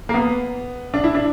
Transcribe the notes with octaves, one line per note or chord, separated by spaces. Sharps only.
A#3
B3
D4
E4
D4